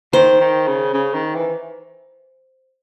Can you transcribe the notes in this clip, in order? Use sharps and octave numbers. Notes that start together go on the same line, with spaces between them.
D#3 C5
D#3
C#3
C#3
D#3
E3